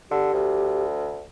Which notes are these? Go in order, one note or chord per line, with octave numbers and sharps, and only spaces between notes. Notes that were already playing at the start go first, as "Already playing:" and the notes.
D3 G4
D2